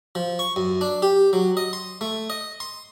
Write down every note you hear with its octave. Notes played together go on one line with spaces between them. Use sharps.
F3
C#6
F#2
D4
G4
F#3
D#5
C6
A3
D#5
C6